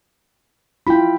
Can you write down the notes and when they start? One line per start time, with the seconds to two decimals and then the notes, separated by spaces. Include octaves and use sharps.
0.87 E4 F4 G5 B5